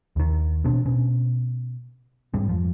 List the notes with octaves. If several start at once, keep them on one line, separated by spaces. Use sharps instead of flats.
D#2 D#3
A1 B2 C4 D4
B2 C#4
G#2 G3 C4
F2 F3